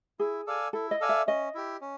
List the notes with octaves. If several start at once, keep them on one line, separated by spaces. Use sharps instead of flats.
E4 G#4
A4 D5 F5 G#5
E4 A4
D#5
A4 D5 F5 G#5
E5
C#4 D#5
E4 G4
C#4